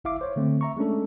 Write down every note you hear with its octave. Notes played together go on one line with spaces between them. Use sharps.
G1 E4 E5 F5 D6
C5 C#5
D3 A3 C4
E5 A#5 C#6
G#3 A3 C#4 D4 A4